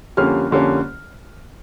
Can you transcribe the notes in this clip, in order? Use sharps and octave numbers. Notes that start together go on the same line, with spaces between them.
F2 D3 G3 A#3 C#4 F6
F2 D3 G3 A#3 C#4